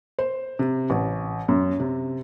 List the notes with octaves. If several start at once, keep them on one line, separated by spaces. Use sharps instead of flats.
C5
C3
A1
F#2
C3